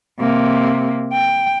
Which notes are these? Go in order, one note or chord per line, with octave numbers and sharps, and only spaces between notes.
C3 A#3
G5